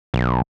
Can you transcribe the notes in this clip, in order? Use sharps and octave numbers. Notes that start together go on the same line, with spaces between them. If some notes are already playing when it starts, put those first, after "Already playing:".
B1